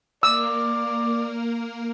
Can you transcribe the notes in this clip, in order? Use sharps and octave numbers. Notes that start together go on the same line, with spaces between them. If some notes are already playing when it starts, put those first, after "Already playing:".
A#3 A#4 D5 E6